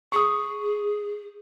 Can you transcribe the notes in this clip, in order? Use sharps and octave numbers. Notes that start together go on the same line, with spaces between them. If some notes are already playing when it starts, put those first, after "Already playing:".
G#4 C#6 D#6